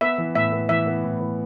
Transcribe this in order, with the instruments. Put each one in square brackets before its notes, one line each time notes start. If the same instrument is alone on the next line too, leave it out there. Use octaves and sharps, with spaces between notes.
[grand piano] B3 [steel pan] E5
[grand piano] E3
[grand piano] A2 [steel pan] E5
[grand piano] B3
[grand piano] E3 [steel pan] E5
[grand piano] B3
A2
E3